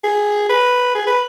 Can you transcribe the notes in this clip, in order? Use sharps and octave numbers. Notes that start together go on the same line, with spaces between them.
G#4
B4
G#4
B4